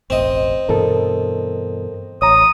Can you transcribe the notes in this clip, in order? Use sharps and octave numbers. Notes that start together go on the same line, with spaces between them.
E1 A1 C4 D#5
G2 B2 E3 A4 A#4
A1 C#5 A#5 D#6